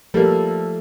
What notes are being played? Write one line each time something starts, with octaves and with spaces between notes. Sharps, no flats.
F3 G3 A3 A#3 A4